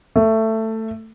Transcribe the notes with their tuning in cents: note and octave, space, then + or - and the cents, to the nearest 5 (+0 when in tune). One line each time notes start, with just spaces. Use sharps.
A3 +15